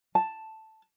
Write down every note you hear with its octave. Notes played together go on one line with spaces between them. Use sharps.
A5